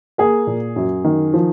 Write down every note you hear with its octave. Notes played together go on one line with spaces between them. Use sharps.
A#3 G#4
A#2
F#2
D#3
F3